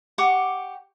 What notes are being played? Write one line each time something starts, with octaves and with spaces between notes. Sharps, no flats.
G4 F#5 C#6 D6